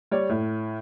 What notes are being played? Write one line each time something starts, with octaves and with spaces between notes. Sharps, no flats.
G3 C#5 D5
A2